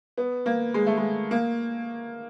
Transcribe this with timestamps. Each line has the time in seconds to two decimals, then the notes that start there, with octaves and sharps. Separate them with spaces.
0.17 B3
0.46 A#3
0.74 G#3
0.87 A3
0.98 G#3
1.31 A#3